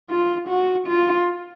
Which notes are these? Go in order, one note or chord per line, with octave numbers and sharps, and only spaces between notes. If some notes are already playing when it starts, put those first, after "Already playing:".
F4
F#4
F4